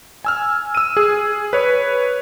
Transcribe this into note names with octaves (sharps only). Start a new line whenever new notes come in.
G#5 E6 F6
E6 D#7
G#4
B4 C#5